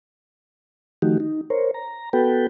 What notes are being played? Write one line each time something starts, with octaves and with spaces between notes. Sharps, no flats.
D#3 F3 A3 D#4 F#4 G4
D#4
A#4 C5 C#5
A#5
B3 F#4 A4 B4 G5